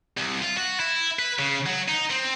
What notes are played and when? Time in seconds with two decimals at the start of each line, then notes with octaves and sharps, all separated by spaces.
0.18 C2
0.41 F4
0.57 F#4
0.80 E4
1.19 B4
1.39 C#3
1.66 F#3
1.88 D#4
2.10 C4